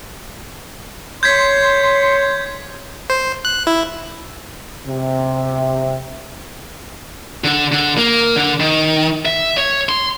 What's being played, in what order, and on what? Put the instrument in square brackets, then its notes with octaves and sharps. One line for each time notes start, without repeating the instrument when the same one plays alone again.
[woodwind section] C#5 C6 [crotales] G6 G#6 B6
[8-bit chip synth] C5
F#6
E4
[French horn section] C3
[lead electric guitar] D3
D3
A#3
D3
D#3
E5
C#5
C6